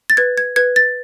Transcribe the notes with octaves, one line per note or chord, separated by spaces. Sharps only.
A6
B4 G#6
G#6
B4 G#6
A6